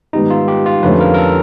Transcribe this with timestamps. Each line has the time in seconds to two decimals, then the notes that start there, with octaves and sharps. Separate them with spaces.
0.13 G#2 D#3 G3 B3 D#4
0.30 F4
0.48 G4
0.66 F4
0.83 F2 D3 F3 A3 C#4 B4
1.01 A#4
1.14 A#4
1.18 A4